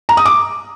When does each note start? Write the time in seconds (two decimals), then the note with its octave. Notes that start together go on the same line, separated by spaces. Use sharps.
0.09 A#5
0.17 D#6
0.26 D6